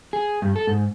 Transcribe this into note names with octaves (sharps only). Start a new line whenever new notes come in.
G#4
G2
A4
G#2